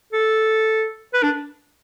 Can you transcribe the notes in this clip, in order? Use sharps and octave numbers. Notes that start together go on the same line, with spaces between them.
A4
B4
D4